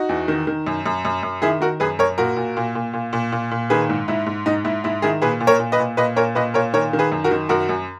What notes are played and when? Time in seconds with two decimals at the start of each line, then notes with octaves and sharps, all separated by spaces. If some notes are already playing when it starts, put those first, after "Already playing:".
Already playing: D#4 F#4
0.09 E2
0.28 D#3
0.47 D#3
0.67 F#2
0.86 F#2
1.05 F#2
1.23 F#2
1.42 D#3 E4 G#4
1.61 D#3 F#4 A#4
1.80 F#2 G#4 B4
1.99 F#2 A#4 C#5
2.18 A#2 F#4 A#4
2.37 A#2
2.57 A#2
2.75 A#2
2.93 A#2
3.13 A#2
3.32 A#2
3.51 A#2
3.70 D#3 G#4 B4
3.89 G#2
4.08 G#2 E4
4.26 G#2
4.46 G#2 D#4
4.65 G#2 E4
4.84 G#2 E4
5.02 D#3 E4 G#4
5.22 A#2 G#4 B4
5.40 A#2
5.47 A#4 C#5
5.59 A#2
5.72 B4 D#5
5.79 A#2
5.97 A#2 B4 D#5
6.16 A#2 A#4 C#5
6.35 A#2 B4 D#5
6.54 A#2 A#4 C#5
6.73 D#3 A#4 C#5
6.93 D#3
6.99 G#4 B4
7.12 F#2
7.24 F#4 A#4
7.31 D#3
7.49 F#2 F#4 A#4
7.69 F#2